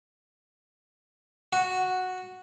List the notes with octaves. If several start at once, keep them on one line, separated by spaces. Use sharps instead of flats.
F#4